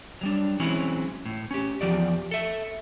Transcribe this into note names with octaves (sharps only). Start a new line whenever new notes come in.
F#3 G3 D4
E3 F#3 G#3 C4 C#4 E4
A2
C#4 G4
E2 G#2 F3 G4 D5
A4 E5